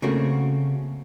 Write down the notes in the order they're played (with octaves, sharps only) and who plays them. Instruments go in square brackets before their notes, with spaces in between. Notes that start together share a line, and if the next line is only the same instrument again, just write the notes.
[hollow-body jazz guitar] C#3 A3 A#3 C4 F#4